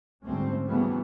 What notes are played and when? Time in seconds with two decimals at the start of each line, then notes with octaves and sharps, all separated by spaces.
0.23 D2 G#2 G3 A3 C4 C#4
0.66 C#3 E3 F#3 G3 A3 B3